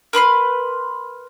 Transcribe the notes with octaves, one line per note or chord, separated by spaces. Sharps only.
A#4 B4 B5 C6